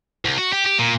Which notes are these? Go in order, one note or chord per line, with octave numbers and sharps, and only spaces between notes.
C2
F#4
G4
G4
A#2